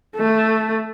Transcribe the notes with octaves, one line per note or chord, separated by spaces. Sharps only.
A3